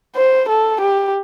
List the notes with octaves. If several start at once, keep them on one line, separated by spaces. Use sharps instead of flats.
C5
A4
G4